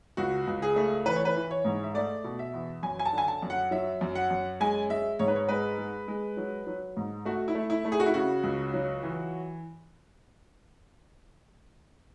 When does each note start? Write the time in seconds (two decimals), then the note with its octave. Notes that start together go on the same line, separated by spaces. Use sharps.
0.17 C#2 F#4
0.47 C#2
0.62 G#4
0.76 A3
1.06 E3 B4
1.16 C#5
1.25 B4
1.36 E3
1.51 C#5
1.65 G#2
1.83 E5
1.94 A3 D5
2.24 B2
2.39 E5
2.54 E2
2.83 F#2 G#5
2.99 G#5
3.06 A5
3.13 D3
3.18 G#5
3.28 A5
3.42 F#2
3.50 F#5
3.71 F#3 E5
4.01 F#2
4.15 F#5
4.30 F#2
4.60 G#3 G#5
4.90 G#3 E5
5.19 G#2 C#5
5.28 B4
5.36 C#5
5.48 G#3 B4
5.78 G#3
6.08 G#3
6.37 F#3
6.67 F#3
6.97 G#2
7.25 A3 F#4
7.48 E4
7.55 A3
7.70 E4
7.85 A3
7.92 G#4
8.00 F#4
8.06 E4
8.14 C#3 F#4
8.43 C#2
8.74 F#3
9.03 E3